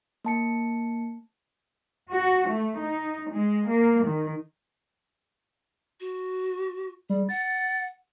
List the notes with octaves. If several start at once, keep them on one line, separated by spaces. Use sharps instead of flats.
A#3 A5 C#7
F#4
A3
D#4
G#3
A#3
D#3
F#4
G3 G#4
F#5 A6